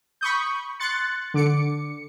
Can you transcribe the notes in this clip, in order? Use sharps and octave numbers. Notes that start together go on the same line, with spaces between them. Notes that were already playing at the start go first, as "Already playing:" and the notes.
B5 C#6 D#6 G6
C6 F#6 A6 C#7
D3 D6 C#7